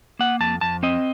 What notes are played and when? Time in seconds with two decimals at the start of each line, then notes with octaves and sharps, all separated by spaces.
0.19 A#3 F#5
0.40 F2 A5
0.61 F2 A5
0.83 C4 D#5